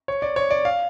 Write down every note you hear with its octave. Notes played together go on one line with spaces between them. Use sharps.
C#5
D5
C#5
D5
F5